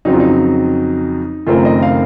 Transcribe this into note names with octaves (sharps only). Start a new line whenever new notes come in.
F2 C#3 F#3 C4 D#4
F4
D#4
F#1 F#2 D#3 A3 C4 F4
D#5
F5